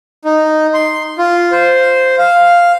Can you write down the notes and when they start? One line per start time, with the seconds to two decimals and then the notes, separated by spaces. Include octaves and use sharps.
0.25 D#4
0.74 C6
1.18 F4
1.51 C5
2.18 F5